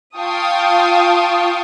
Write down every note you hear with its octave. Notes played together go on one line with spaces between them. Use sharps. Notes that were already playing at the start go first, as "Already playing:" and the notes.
F4 F5 G5 A5 C#6 D#6